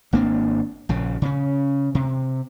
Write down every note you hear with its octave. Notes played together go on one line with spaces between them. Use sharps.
G#1 A#3 C4 D4
A#1 C#3
C#3 C#4
C3